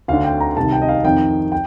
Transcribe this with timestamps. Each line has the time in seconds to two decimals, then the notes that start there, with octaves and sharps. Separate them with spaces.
0.08 D2 D3 F5
0.24 G5
0.40 A#5
0.57 C2 C3 D#3 A5
0.72 G5
0.82 D#5
0.89 F5
1.04 F2 D#3 G5
1.52 G5